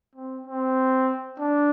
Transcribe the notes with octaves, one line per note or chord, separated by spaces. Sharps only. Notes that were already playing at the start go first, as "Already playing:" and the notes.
C4
C4
D4